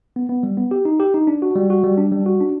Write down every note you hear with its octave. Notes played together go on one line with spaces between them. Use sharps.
B3
B3
G3
B3
G4
D#4
G4
D#4
D4
F#4
G3
F#4
G3
D4
G3
F#4
D4